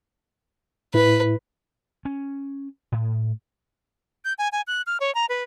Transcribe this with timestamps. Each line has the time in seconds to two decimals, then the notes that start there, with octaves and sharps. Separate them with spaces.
0.94 A2 E4 B4
2.05 C#4
2.92 A2
4.25 G6
4.38 G#5
4.52 G#5
4.67 F#6
4.87 F6
5.00 C#5
5.15 A#5
5.29 B4